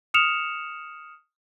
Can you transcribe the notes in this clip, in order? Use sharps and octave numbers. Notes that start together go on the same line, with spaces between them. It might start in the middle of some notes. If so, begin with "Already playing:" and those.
D#6 F6 C#7 E7 F7